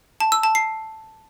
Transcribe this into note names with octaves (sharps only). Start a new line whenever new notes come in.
A5
E6
A5
C7